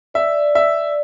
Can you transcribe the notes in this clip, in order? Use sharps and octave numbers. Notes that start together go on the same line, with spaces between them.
D5 E5
D5 E5